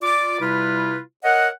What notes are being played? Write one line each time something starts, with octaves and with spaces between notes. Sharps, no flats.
F4 D5 D6
C3 G3 E4 F4 B4
A#4 C#5 D#5 F#5